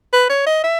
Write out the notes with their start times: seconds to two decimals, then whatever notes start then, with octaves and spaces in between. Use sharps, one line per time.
0.13 B4
0.29 C#5
0.47 D#5
0.64 E5